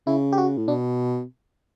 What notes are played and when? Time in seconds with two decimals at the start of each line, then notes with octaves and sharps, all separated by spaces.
0.07 C#3 E4
0.32 G4
0.38 F#4
0.58 A2
0.68 B2 D4